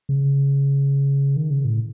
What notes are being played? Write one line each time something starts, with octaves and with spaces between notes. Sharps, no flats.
C#3
D#3
C#3
A2